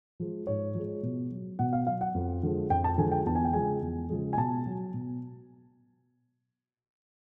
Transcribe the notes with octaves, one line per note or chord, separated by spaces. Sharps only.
F3 G#3
G#2 C#5
F3 G#3
B2
F#3
B2 F#5
F5
F#3 F5
F#5
F2
D3 F3 G#3
F2 G5
A5
D3 F3 G#3 G#5
G5
E2 A5
G#5
G5
C#3 F3 G#3 G#5
E2
C#3 F3 G#3
G#5
B2 A5
F#3
B2